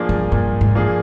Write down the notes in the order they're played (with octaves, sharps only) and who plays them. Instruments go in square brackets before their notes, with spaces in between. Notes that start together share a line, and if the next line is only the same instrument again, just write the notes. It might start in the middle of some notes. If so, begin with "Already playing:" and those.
Already playing: [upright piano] A#2 F3 A#3 D4 G#4
[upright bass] G2
[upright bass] G2 [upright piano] A#2
[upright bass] G#2
[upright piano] F3 A#3 D4 G#4